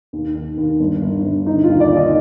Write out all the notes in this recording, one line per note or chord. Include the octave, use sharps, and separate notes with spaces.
D#2
D#3
D#2
G1
G1
G1
D3 D#4
F4
D#2
D5
D#2
D#5